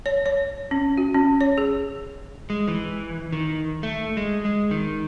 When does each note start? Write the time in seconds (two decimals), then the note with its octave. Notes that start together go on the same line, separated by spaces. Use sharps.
0.06 C#5
0.26 C#5
0.71 C#4
0.98 F#4
1.14 C#4
1.41 C#5
1.58 G#4
2.50 G#3
2.68 E3
3.32 D#3
3.83 A3
4.17 G#3
4.45 G#3
4.71 D#3